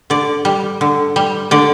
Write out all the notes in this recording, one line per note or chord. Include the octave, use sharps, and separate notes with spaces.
D3 D5
G3
D3
G3
D3 D5